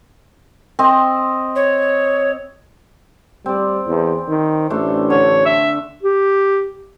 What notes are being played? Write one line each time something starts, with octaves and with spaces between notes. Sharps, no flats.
C4 D#5
C#5
G3 C4 D5
E2
D#3
A1 A3 D4 C6
D3 C#5
E5
G4